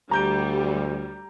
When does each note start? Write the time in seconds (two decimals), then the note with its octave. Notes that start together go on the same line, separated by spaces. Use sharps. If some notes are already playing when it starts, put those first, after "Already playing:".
0.11 D2 G3 A#5 G6 D7